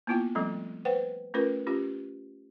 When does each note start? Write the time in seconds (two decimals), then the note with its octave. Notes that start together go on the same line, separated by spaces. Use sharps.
0.07 A#3 B3 E4 F4 G5
0.35 F3 G3 A3 C4 A4
0.85 B4 C5 F#5 G5
1.34 A3 C#4 F4 A#4 B4
1.67 C#4 F4 G4